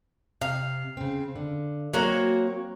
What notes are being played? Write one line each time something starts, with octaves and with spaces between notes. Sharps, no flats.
C3 F5
C#3 C4
D3
F#3 A#3 C4 F#4 C#5